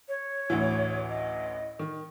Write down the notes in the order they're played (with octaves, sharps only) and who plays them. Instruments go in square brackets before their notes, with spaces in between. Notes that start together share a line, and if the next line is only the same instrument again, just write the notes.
[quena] C#5
[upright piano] A1 D2 E3
[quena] D#5
[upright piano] D#3